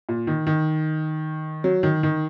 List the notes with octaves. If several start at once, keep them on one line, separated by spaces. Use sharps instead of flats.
A#2
D#3
D#3
F#3
D#3
D#3